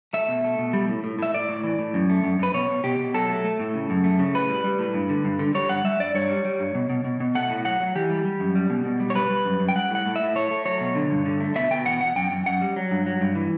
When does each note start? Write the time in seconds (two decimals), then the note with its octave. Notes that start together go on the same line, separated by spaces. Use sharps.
0.13 A3 E5
0.29 B2
0.44 A3
0.59 B2
0.73 G3
0.89 A2
1.04 A2
1.19 A2 E5
1.34 A2 D5
1.49 A2
1.64 E3
1.79 A2
1.94 F#2
2.09 A3
2.24 F#2
2.39 F#2 B4
2.54 B2 C#5
2.69 B2
2.84 B2 G4
2.99 B2
3.14 F#3 A4
3.29 A3
3.44 A3
3.59 A2
3.74 C#3
3.90 F#2
4.04 A3
4.19 C#3
4.35 A2 B4
4.49 G3
4.64 G3
4.79 A2
4.94 G2
5.09 D3
5.24 G2
5.39 D3
5.55 G3 C#5
5.69 G2 F#5
5.84 G3 E5
6.00 G2 D5
6.15 G2 C#5
6.30 G3
6.45 G3
6.60 G2
6.75 B2
6.90 B2
7.04 B2
7.20 B2
7.35 A3 F#5
7.50 A2
7.65 F#3 F#5
7.80 F#3
7.95 E3 G4
8.10 G3
8.25 G3
8.40 F#2
8.55 G3
8.70 B2
8.85 B2
9.00 G3
9.10 C#5
9.15 G3 B4
9.30 G3
9.45 F#2
9.60 F#2
9.68 G5
9.75 G3 F#5
9.91 A2 F#5
10.06 A2
10.16 A2 E5
10.35 A3 C#5
10.51 A3
10.66 F#3 C#5
10.81 B2
10.95 D3
11.11 G2
11.26 D3
11.41 A3
11.56 B2 E5
11.71 B2 G5
11.86 E2 F#5
12.01 E2 F#5
12.16 F#2 G5
12.31 F#2
12.46 F#2 F#5
12.61 G3
12.76 F#3
12.91 G2
13.06 F#3
13.21 G2
13.35 E3